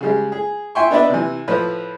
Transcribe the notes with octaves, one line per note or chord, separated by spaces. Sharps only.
C#3 G3 G#3
G#4
E5 G5 G#5 C6 C#6
B3 D4 D#4 B4 D5 E5
C3 E3
A2 F3 B4